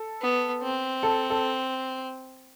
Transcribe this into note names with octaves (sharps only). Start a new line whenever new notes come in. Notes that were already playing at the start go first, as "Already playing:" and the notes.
Already playing: A4
B3
C4
A4
A4